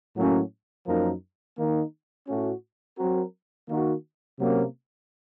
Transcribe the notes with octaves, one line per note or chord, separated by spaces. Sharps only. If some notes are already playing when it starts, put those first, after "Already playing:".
A2 F#3 A#3 C#4 F#4
F#2 F3 A#3 D#4 A#4
D#3 A#3 D#4
A2 A3 C#4 F#4
F#3 C4 F#4 A#4
D#3 A#3 D#4 F#4
C3 F#3 A#3 C#4